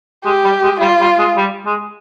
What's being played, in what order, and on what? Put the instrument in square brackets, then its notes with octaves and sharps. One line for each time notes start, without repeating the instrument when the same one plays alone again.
[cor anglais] G#3 [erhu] G4
[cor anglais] G3
G#3
[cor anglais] G3 [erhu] F4
[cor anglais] G3
G#3
G3
G#3